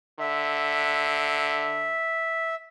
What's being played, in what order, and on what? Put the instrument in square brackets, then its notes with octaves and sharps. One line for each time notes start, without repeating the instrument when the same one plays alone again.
[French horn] D3 [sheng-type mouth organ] E5